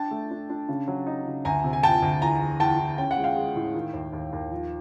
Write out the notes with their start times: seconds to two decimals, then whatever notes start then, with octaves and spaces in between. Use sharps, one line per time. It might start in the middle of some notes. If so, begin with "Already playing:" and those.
Already playing: D4 G5 A5
0.11 A3
0.31 D4
0.50 D4
0.69 C#3
0.88 F#3
1.06 D#4
1.26 C#3
1.45 D2 G#5 A#5
1.64 C3
1.73 G#5
1.83 D2 G5 A5
2.02 D2
2.22 E2 G#5 A#5
2.41 E2
2.60 E2 G5 A5
2.79 E2
2.98 C#4 G5
3.11 F#5
3.17 G#3
3.24 F5 G5
3.36 G#3
3.56 A2
3.74 D#3
3.93 D#2
4.13 D#2
4.32 D#2
4.51 F3